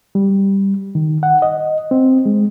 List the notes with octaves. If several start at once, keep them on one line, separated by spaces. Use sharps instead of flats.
G3
D#3
F#5
D#5
C4
G#3